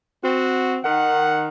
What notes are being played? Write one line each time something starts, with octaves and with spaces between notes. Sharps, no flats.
C4 F#4
D#3 F#5